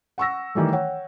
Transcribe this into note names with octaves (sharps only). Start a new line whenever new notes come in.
F#5 C#6 E6 A#6
D#3 E3 G3 A3
C#5 F#5 G5